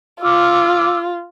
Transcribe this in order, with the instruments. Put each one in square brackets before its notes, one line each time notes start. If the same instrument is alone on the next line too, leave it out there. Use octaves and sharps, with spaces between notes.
[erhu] F4 [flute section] D6 E6 F6